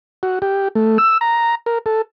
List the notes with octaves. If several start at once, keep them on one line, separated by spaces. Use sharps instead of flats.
F#4
G4
A3
E6
A#5
A#4
A4